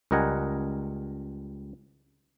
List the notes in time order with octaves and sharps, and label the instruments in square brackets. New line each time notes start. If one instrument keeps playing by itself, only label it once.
[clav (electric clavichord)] C#2 G3 A#4 D#5 F#5 G#5